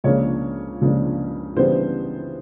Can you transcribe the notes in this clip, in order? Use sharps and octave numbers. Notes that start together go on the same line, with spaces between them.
C#2 C#3 F3 A#3 D4 C#5
C#2 C#3 F3 A#3 D4
C#3 E3 G3 B3 D4 C5